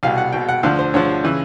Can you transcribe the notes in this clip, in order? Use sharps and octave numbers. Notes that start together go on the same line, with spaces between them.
C2 B2 F5
F#5
C2 B2 G5
F#5
D2 D3 F3 F5
C5
D2 D3 F3 C#5
C#3 E3